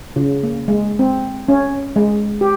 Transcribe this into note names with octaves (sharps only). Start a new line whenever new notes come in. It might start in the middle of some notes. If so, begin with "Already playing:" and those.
C#3
A#3
G#3
C4
C#4
G#3
G4